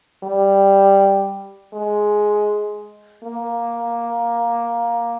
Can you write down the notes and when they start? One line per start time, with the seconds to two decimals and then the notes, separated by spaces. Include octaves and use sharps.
0.23 G3
1.74 G#3
3.24 A#3